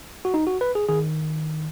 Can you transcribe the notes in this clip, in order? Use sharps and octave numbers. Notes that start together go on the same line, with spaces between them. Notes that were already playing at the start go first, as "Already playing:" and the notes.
F#4
D#4
F#4
B4
G#4
D#3 G#4